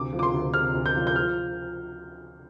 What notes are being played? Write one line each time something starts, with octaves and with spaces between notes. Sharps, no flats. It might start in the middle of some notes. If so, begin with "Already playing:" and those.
Already playing: D2 C3 D6
F3
D6
C6
D2
C3 F6
D2
G6
F3
G6
F3 F6